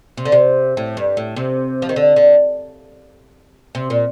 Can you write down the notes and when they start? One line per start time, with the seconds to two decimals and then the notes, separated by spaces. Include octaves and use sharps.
0.17 C3
0.25 D3
0.32 C3
0.77 A2
0.97 G2
1.17 A2
1.36 C3
1.82 F3
1.89 D#3
1.96 D3
2.16 D3
3.75 C3
3.90 A#2